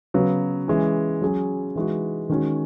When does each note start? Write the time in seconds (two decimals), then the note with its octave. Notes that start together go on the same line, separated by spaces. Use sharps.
0.14 C#3 F#3 B3 F#4
0.68 E3 G#3 C#4
1.22 F#3 C#4 G#4
1.76 E3 G#3 D#4 F#4
2.29 D#3 G#3 C#4 F#4